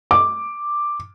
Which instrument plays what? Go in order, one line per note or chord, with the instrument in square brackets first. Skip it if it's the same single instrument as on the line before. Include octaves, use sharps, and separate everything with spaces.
[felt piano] D6